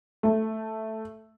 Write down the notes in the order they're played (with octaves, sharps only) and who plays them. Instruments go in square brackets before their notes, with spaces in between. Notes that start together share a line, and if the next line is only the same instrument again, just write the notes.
[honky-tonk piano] A3